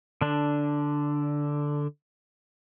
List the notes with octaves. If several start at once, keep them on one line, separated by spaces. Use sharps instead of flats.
D3 D4